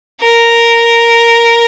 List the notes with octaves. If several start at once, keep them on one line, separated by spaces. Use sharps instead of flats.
A#4